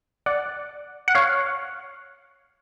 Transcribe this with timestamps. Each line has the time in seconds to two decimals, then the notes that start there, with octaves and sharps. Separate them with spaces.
0.26 D5 F#5
1.08 F#5
1.15 C#5 F5